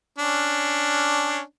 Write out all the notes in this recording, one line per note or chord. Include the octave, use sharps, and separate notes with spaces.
C#4 D4